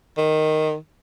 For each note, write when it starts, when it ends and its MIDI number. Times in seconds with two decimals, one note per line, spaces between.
0.18 0.76 51